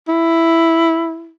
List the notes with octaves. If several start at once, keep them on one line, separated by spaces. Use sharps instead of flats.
E4